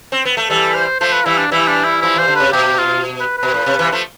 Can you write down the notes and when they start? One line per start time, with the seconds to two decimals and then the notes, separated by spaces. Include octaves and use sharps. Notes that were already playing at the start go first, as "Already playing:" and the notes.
0.12 C4
0.25 B3
0.37 A3
0.50 E3 G3 A4
0.75 C5
1.00 F3 A3 C5
1.13 B4
1.26 E3 G3 E4
1.38 D4
1.52 E3 G3 E4
1.68 D4
1.85 E4
2.02 F3 E4
2.16 E3 C5
2.28 D3
2.36 C3 B4
2.53 B2 G4
2.78 F4
3.20 B4
3.38 B2 B4
3.54 A2
3.66 C3
3.79 C3 E3
3.92 F3 A3